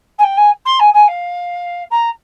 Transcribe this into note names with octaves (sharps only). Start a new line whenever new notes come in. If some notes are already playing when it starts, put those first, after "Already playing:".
G#5
G5
G#5
C6
G#5
G#5
F5
A#5